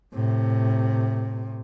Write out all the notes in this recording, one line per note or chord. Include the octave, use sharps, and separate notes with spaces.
A2 C3